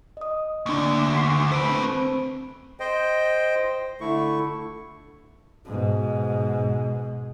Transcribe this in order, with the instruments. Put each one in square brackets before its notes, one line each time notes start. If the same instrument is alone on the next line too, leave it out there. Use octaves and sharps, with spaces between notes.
[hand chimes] D#5 D#6
[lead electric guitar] D2 D3 [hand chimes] A#3 D4
[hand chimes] B6 C7
[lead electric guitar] A3 B4 [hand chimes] C5 D7
[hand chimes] C4
[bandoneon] C5 D#5 G5
D3 A3 E4 C#6
[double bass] G#2 B2